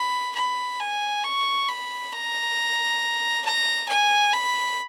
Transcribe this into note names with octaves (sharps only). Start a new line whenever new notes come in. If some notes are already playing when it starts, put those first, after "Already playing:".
Already playing: B5
B5
G#5
C#6
B5
A#5
A#5
G#5
B5